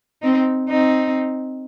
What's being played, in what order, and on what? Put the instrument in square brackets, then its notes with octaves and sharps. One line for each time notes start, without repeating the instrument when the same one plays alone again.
[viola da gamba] C4 D#4
C4 D#4